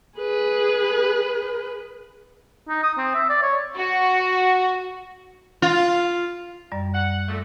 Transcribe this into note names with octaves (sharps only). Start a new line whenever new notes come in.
G#4 B4
D#4
D#6
C4
E5
D5
C#5
F#4
F4
F#2 G3 D5
F#5
A#2 A3